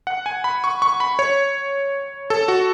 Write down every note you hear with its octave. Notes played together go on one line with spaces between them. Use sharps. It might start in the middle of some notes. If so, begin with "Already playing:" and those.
F#5
G#5
B5
C#6
C#6
B5
C#5
A4
F#4